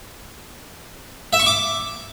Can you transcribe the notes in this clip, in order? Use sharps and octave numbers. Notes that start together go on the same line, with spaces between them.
E5
C#6
D6